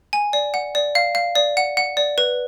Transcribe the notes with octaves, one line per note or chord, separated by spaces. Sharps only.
G#5
D5
F#5
D5
F5
F5
D5
F#5
F#5
D5
B4